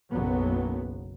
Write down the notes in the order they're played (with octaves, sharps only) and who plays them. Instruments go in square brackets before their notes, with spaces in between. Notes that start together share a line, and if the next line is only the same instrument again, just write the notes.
[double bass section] F#1 B1 F#3 B3